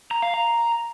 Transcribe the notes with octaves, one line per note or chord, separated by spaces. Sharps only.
A#5
F5
A#5